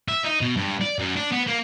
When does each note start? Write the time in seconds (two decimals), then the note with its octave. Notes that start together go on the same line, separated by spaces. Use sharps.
0.08 E5
0.24 D#4
0.41 B2
0.57 G2
0.81 D5
0.99 F#2
1.16 D4
1.32 B3
1.48 A#3